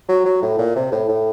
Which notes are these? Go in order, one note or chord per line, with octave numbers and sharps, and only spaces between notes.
F#3
F#3
A2
A#2
C3
A2
A2